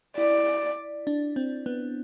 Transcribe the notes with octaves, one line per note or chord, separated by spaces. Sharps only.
E4 D5
D4
C4
B3